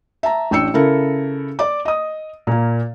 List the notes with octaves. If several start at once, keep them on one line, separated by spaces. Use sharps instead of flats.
E5 A5 A#5
A1 D4 G5 E6 C#7
C#3 E4 A4 A#4
D5 D6
D#5 D#6
A#2 A#3